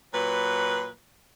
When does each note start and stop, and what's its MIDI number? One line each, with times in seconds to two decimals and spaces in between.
0.14 0.89 46
0.14 0.89 54
0.14 0.89 71